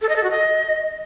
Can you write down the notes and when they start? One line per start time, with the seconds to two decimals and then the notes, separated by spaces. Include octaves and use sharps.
0.02 A4
0.09 D#5
0.16 A4
0.24 F#4
0.31 D#5